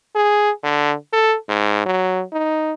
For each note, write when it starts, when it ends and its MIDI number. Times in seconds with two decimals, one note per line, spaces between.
0.16 0.51 68
0.63 0.95 50
1.13 1.35 69
1.49 1.84 44
1.86 2.23 54
2.33 2.73 63